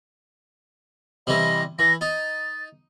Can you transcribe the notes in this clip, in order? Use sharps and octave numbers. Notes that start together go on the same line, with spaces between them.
C3 E3 G3 D#5
E3 A#6
D#4 A6